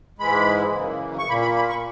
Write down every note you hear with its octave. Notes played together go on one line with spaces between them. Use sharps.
G#2 E3 G#3 B5
F#2 C#3 E3 A#3
C#6
A#2 A#3 B5
B5
B5
C#6